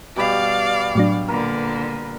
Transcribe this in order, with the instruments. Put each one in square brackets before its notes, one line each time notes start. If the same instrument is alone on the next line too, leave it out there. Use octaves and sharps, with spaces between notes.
[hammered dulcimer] B2 G3 B5 [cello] D5 F5
[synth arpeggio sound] A2 F#3 D4
[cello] A#2 D3 [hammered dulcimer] A#4 B4